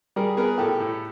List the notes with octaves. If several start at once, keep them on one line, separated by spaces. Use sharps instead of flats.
G3 G#4 A#4
B3 G#4 A#4
A2 G4 A4
A2